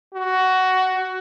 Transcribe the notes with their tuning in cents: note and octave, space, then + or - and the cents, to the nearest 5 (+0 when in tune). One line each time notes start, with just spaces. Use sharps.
F#4 +15